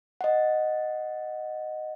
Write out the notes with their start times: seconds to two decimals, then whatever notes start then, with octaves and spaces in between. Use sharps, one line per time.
0.21 D#5 F#5